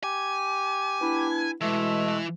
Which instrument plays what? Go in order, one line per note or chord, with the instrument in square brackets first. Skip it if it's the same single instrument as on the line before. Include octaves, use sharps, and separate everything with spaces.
[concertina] G4 [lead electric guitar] G#5
[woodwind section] B3 D4 E4
[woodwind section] B2 G#3 [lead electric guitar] E3 [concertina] A3 E5